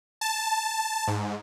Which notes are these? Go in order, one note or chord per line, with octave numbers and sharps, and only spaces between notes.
A5
G#2